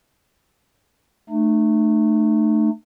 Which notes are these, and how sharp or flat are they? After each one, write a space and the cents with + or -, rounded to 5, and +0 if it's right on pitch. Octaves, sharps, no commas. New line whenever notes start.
A3 +0 D#4 -45